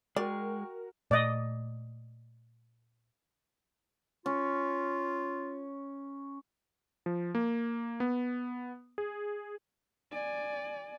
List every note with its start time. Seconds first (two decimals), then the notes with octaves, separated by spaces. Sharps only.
0.16 G#3 F#4 A#4 D5 G5 C#6 F6
1.11 A#2 A3 D5 D#5
4.26 C#4 F4
7.06 F3
7.35 A#3
8.00 B3
8.98 G#4
10.12 D5 G#5